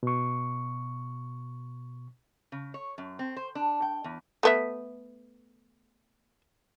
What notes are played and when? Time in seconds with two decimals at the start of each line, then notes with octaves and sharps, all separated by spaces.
0.03 B2 C#6
2.52 C#3
2.74 C#5
2.98 F#2
3.19 C4
3.37 C5
3.55 D4
3.82 G5
4.04 E2
4.43 A3 B3 E5